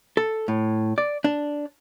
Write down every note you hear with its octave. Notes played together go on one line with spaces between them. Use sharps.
A4
A2
D5
D4